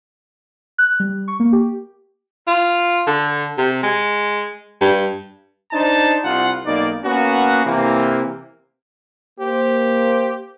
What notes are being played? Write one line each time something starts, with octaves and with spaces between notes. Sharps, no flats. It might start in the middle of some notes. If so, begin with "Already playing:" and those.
F#6
G3
C#6
A#3
G4
F4
D3
C3
G#3
G2
D4 D#4 C5 A5
C2 F4 F#5
B1 A#3 D#4 D5
A#3 B3 C#4 F#4
C3 E3 A#3
A#3 G4 C5